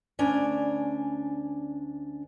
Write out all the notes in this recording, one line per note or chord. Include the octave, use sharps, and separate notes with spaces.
D2 C#4 D4 G#5